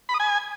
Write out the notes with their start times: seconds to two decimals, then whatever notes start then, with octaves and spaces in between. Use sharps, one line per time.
0.09 B5
0.14 D#6
0.20 G#5